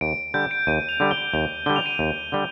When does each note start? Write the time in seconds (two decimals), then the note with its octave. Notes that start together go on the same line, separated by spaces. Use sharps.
0.01 D#2 D7
0.34 D3 G3 G6
0.51 D7
0.67 D#2 D#7
0.89 F7
1.00 D3 G3
1.11 G7
1.34 D#2 F7
1.66 D3 G3 G7
1.76 F7
1.86 D#7
1.95 D#2 F7
2.32 D3 G3